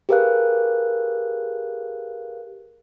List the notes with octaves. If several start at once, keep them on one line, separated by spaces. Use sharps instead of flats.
G4 G#4 A#4 B4 F5 F#6